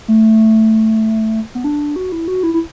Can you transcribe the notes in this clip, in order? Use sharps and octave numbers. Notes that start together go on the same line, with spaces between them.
A3
B3
D4
F#4
E4
F#4
E4
E4